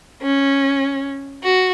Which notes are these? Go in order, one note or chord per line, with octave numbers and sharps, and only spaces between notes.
C#4
F#4